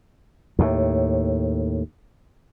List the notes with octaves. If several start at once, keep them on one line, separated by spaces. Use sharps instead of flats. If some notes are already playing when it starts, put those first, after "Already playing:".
D#2 A2